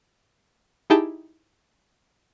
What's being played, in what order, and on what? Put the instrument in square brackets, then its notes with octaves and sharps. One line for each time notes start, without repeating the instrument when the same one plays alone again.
[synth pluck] D#4 E4 G4 G#4 G5 A5